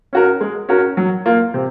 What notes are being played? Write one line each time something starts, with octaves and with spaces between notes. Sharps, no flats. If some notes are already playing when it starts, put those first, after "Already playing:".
C#4 F#4 A#4
G#3
C#4 F#4 A#4
F#3
A#3 F4
C3